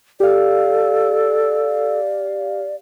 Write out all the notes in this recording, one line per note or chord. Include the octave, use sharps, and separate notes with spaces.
G4 A4 D5 F5